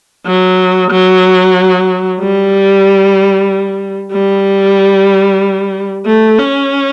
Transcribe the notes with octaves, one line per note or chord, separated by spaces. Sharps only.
F#3
F#3
G3
G3
A3
C#4